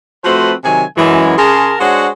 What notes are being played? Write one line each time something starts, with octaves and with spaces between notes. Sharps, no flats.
F3 A3 C4 F#4 B4 C5
C3 D#3 F#3 G#5
F#2 E3 G#3
C#3 G#4 A#4 G#5 A5 C6
G#3 D4 F#4 C5 C#5 F#5